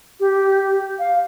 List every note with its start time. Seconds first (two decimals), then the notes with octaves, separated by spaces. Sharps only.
0.20 G4
0.99 F5